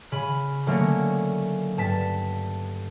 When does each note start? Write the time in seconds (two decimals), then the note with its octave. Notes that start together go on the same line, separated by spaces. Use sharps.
0.12 C#3 B5 D#7
0.66 D3 F#3 A3 A#3 C#4
1.77 G2 A5 B6